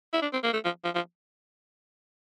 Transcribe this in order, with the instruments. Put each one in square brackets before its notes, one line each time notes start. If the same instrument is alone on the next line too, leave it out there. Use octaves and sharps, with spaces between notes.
[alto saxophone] E4
D4
C4
A#3
A3
F3
F3
F3